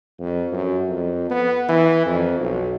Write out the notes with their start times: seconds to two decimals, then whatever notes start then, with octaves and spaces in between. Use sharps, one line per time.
0.20 F2
0.52 F#2
0.88 F2
1.30 B3
1.69 E3
2.06 F2
2.39 B1